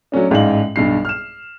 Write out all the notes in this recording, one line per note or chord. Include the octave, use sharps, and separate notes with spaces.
F#3 A3 C#4 D4
A1 G#2 D5 D#5 F5 F#7
B1 G2 C7
F6 E7